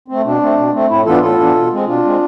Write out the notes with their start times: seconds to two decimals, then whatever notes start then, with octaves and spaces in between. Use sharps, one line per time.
0.08 A3 C4
0.25 B2 D4
0.42 A3 C4
0.57 B2
0.73 A3 C4
0.90 A2 E4
1.06 E3 B3 D4 F4 A4
1.22 A2 F4 A4
1.39 E3 B3 D4
1.55 B2
1.72 G#3 C4
1.87 B2 D4 F4
2.04 G#3 C4